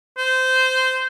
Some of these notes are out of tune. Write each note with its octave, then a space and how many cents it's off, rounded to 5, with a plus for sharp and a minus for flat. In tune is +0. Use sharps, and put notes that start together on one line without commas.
C5 -15